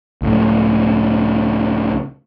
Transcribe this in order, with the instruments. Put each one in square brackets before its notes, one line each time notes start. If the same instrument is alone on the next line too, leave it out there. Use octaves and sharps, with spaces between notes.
[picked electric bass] C#2 A2